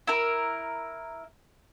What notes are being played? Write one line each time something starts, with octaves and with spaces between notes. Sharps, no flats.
E4 A#4